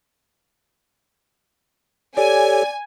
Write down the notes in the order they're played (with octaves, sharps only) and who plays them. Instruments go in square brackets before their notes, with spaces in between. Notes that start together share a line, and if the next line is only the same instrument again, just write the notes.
[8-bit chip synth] G4 A4 C#5 [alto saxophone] D5 [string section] G#5